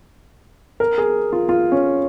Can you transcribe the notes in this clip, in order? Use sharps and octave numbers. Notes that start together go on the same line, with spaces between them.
A#4
G#4
F4
F4
C#4